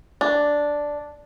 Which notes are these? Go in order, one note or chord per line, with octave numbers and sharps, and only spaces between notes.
D4